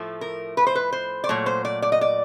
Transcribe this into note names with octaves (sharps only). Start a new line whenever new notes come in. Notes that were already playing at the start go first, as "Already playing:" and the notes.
Already playing: A2 F3 A3
A#4
B4
C5
B4
C5
D5
A#2 F#3 A3 C#5
C5
D5
D5
D#5
D5